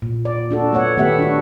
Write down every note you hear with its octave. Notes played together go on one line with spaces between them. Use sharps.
A#2
D5
D4 F#4 A4
A3 B3 C#5 F#5
D#3 A3 B3 G4 E5 F#5
D4 F#4